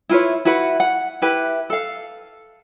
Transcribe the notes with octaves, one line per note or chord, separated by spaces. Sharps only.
E4 F4 B4 C#5
E4 F#4 B4 F#5
F#5
E4 G4 B4
A4 F5